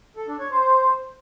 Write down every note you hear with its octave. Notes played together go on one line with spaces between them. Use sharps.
A4
D4
C#5
C5